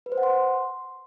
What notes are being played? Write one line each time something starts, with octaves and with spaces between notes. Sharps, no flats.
B4
C5
F#5
C6